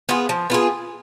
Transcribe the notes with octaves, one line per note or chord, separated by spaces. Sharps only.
B3 F4 G#4
F3
B3 F4 G#4